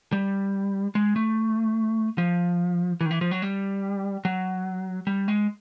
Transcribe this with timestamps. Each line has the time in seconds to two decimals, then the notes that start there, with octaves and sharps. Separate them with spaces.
0.13 G3
0.95 G#3
1.16 A3
2.18 F3
3.01 E3
3.06 D#3
3.11 E3
3.21 F3
3.31 F#3
3.42 G3
4.25 F#3
5.07 G3
5.28 G#3